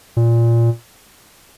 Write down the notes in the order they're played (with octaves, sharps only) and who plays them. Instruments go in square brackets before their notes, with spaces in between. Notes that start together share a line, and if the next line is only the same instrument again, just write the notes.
[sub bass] A#2